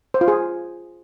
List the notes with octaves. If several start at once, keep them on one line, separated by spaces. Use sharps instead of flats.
C5
F4
G#4